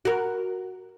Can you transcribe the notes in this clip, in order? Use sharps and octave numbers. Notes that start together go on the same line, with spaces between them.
F#4 A#4